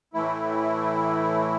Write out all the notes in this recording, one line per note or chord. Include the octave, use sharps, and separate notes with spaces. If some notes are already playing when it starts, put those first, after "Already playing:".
A2 E3 A3 E4